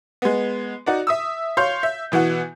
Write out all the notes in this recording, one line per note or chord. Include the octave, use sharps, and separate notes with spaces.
G#3 B3
D#4 F#4 D5
E5 D#6 E6
C#5 F5 C6 G6
E5
B2 E3 B3 F#4